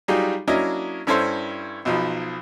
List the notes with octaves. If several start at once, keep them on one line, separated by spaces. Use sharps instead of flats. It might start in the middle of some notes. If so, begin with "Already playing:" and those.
F#3 G3 D#4 F4 G4 G#4
F#3 A#3 C#4 D4 E4 D#5
G2 C#4 E4 A4 C5 C6
B1 B2 F3 D#4